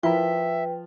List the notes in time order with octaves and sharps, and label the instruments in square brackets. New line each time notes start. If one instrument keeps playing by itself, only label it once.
[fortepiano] F3 [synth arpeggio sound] E4 A#4 [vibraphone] B4 G5 [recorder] E5